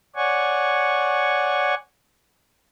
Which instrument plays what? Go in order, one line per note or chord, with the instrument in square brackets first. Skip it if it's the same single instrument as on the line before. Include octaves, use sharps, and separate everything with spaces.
[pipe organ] C#5 D5 F#5 G#5 C#6